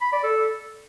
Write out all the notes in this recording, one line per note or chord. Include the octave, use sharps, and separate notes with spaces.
B5
D5
A4